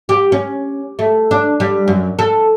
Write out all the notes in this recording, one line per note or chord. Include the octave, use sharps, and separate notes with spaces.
G4
C#4
A3
D4
G3
F#2
A4